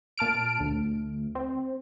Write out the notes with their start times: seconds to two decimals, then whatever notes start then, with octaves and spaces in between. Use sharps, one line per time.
0.18 A#2 A5 F6 D7
0.60 D2
1.35 C4